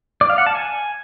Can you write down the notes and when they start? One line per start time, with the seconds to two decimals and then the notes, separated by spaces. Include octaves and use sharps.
0.21 D5
0.30 F5
0.38 F#5
0.47 A5
0.55 G#5